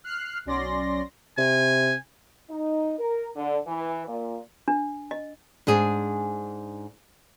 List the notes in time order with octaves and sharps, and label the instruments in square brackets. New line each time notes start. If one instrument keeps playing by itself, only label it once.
[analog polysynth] F6 F#6 C7
B1 F#3 C#4 D5 C6 A#6
[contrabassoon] C3 [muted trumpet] G#5
[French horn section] D#4
A#4
D3
E3
A#2
[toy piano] D4
D#5
[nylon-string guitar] G#2 D4 G#4